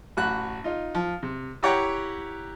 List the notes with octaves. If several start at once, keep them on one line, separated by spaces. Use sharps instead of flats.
A1 F#4 B5 F#6
D#4 F4
F3
C3
E4 G4 C#5 F#5 G5 A#5